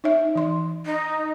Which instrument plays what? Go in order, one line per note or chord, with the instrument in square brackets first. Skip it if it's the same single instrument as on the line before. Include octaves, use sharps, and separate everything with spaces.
[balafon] D#4 C#5 E5
E3 C6
[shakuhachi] D#4